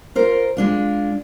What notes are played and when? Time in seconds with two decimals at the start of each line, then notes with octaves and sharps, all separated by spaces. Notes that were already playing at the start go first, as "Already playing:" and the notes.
0.15 F4 A#4 C5
0.57 G#3 D4 F4